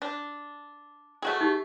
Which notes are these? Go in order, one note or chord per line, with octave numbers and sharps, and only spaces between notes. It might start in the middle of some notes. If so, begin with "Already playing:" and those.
D4
A3 F#4 G#4
D#4 G4